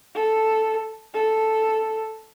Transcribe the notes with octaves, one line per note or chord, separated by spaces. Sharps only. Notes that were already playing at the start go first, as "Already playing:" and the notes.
A4
A4